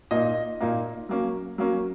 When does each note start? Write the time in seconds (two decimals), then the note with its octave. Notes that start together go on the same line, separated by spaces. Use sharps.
0.11 A#2 A#3 D#4 D#5
0.61 A#2 A#3 D#4
1.09 F#3 A#3 C#4
1.58 F#3 A#3 C#4